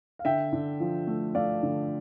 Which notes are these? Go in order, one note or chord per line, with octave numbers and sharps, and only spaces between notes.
F5
D3 E5 G5
D3
F3
A3
A3 D5 F5
D3